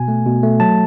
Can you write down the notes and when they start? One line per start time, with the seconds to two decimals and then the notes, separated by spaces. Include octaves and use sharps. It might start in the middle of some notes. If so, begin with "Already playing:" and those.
Already playing: B2 G#5
0.08 A3
0.26 B2
0.43 A3
0.60 F#3 A5